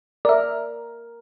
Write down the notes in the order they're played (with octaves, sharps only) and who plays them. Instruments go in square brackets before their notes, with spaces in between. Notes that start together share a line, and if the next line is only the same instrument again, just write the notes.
[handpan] A#4 [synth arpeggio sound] D5 E5